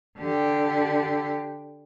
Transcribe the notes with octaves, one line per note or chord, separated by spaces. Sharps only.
D3 G4